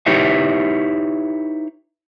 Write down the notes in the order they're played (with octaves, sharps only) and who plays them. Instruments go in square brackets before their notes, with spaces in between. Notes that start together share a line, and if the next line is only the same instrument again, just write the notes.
[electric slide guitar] D#4 E4 G4 B4 C#5 E5